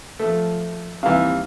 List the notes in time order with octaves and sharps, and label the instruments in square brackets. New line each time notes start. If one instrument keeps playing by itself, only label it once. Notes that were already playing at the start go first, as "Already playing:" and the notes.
[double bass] F3 [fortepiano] A3
[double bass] D#2 G3 [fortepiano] C3 E3 [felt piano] F5